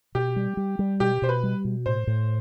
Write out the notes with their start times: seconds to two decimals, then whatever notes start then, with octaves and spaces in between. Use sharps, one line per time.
0.15 B2 G4
0.36 G3
0.57 G3
0.79 G3
1.00 B2 G4
1.22 B2 C5
1.29 B4
1.43 G3
1.65 B2
1.86 A2 C5
2.07 A2